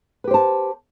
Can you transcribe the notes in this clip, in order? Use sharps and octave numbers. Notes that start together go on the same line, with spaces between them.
G4 B4 C5 A5